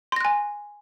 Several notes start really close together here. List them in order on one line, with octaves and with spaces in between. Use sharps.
C6 A#6 F#6 G#5